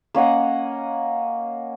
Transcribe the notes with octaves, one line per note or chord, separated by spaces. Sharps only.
A#3 C#4 D#5 F#5